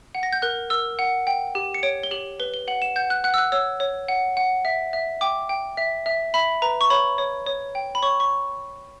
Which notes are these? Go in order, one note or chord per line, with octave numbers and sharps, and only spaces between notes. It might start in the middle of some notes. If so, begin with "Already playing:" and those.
F#5
A#6
G6
A#4 F#6
A#4 E6
F#5
G5
G4
C#7
C#5 D7
G7
G4 F#7
B4 G7
G7
F#5 F#7
E7
F#5 G6
F#6
F#5 F#6
E6
F#6
C#5 E6
C#5
F#5
F#5
E5
E5
G5 D6
G5
E5
E5
E5 B5
B4 A#5
C#6
C#5 B5
C#5
C#5
G5
B5
C#5 C#6
C#6